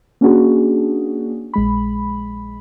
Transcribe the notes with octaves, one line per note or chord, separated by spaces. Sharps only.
A#3 C#4 D4 F#4 G#4
A#1 G#3 B5